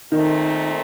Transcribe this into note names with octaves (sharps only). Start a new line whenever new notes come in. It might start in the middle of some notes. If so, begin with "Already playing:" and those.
A#2 D#3 A3 C4 D#4